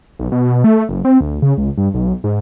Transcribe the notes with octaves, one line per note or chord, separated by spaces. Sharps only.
B1
B2
A3
F#1
C4
D2
C#3
C#2
G2
B1
G#2